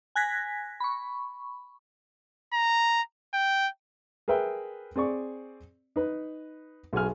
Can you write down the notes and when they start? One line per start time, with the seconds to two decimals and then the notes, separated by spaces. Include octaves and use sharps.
0.15 G#5 F#6 G#6 A#6 B6
0.80 B5 C#6
2.53 A#5
3.34 G5
4.28 G#4 A#4 B4 E5 G5
4.96 C4 G#4 D5 C#6
5.96 D#4 B4
6.93 B1 F#4 G#4 G#5 F6